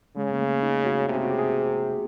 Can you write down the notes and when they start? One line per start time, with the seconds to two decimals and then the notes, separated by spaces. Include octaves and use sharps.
0.16 C#3 G#3
0.32 A#3
0.40 A3
0.63 D#4
0.86 F#4
1.08 C3 G#4
1.16 G4
1.23 F#4
1.30 G4
1.39 G#4